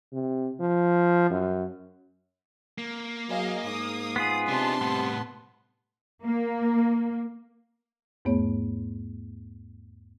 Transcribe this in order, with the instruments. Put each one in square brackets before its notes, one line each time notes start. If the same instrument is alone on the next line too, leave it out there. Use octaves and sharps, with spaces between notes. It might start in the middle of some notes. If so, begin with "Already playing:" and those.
[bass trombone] C3
F3
F#2
[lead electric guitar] A#3
[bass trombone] F#3 [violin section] G#4 D#5 F5
[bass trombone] G#2 [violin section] D#6
[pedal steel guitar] B3 F4 G#4
[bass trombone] C3 [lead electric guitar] D4 D#4 [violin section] A5 C6
[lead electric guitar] A2 G3 [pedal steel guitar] B3
[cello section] A#3
[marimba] E2 G#2 A3 B3 C#5